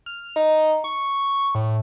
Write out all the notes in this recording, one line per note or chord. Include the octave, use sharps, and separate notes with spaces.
F6
D#4
C#6
A2